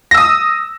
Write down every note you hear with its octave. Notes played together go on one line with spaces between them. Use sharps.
D#6 E6 A#6